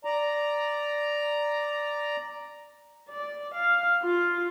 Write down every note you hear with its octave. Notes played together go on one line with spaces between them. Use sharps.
D5 A#5
D5
F5
F4